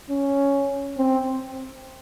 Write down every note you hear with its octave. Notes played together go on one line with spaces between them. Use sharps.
C#4
C4